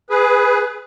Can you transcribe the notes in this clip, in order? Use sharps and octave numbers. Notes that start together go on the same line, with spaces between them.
G#4 B4